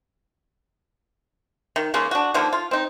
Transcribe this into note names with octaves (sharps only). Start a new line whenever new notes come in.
D#3
C#3 G#3 A#3 C#4
D4 F#4
D3 D#3 F3 A#3
F4
C4 D#4